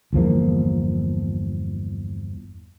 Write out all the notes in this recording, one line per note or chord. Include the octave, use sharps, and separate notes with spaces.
G1 E2 F3 A#3